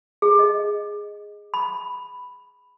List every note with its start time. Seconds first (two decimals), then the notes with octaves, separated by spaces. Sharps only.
0.22 G#4
0.39 D#5
1.54 B5